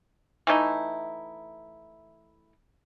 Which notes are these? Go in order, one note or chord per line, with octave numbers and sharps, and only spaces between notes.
E3 A3 D#4 E4